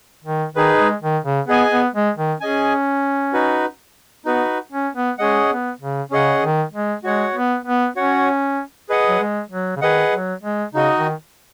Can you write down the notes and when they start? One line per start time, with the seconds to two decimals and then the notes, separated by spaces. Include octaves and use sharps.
0.24 D#3
0.55 D#3 D#4 G#4 B4
0.79 G#3
1.02 D#3
1.24 C#3
1.48 B3 G#4 D#5 G#5
1.71 B3
1.94 G#3
2.17 D#3
2.40 C#4 G#4 D#5 G#5
3.33 D#4 F#4 B4
4.25 B3 D#4 F#4 B4
4.72 C#4
4.95 B3
5.18 G#3 C#4 G#4 D#5 F#5
5.49 B3
5.80 C#3
6.11 C#3 C#4 G#4 D#5 F#5
6.42 D#3
6.73 G#3
7.04 G#3 F#4 C#5 F#5
7.35 B3
7.65 B3
7.96 C#4 F#4 C#5 F#5
8.89 G#4 B4 D#5 F#5
9.09 F#3
9.20 G#3
9.50 F#3
9.76 C#3
9.82 D#3 G#4 B4 D#5 F#5
10.12 F#3
10.43 G#3
10.74 C#3 D#4 F#4 D#5
10.97 D#3